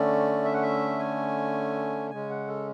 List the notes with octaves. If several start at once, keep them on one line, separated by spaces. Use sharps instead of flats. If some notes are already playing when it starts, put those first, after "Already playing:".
Already playing: D3 A3 C#4 D5
E5
F#5
E5
G#5
C#3 G#3 C#4 G#5
F#5
A4